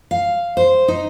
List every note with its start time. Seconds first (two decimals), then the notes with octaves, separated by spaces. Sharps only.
0.11 F5
0.57 C5
0.88 D#4